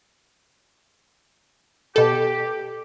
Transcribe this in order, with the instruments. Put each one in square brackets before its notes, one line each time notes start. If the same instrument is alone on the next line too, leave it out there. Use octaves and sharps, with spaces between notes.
[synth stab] B2 A4 [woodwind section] G4